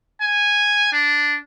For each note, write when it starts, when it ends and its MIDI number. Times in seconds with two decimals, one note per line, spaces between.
0.21 0.89 80
0.93 1.37 62